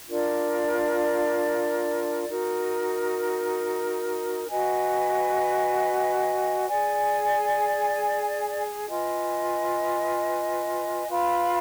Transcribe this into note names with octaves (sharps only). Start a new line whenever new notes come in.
D4 F4 A#4 D5
D#4 F#4 A#4
F#4 B4 D#5 G#5
G#4 D5 G#5
F4 B4 D#5 G#5
F4 B4 F5 B5